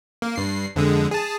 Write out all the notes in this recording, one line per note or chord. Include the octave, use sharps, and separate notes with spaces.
A#3
G2 C7
F2 D3 G#3
G#4 A5